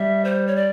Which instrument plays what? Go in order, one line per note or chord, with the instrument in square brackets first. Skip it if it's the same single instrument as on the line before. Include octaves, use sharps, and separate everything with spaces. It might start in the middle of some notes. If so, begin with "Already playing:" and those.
Already playing: [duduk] G3 [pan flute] E5
[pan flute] C5
C#5
D5